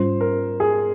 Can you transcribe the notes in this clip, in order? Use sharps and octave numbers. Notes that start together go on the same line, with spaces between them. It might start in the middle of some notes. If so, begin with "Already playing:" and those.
Already playing: G#2 G3 C#4 F4 C5
A#4
G#4